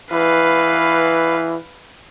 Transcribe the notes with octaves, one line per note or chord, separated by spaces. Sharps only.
E3 B4 F5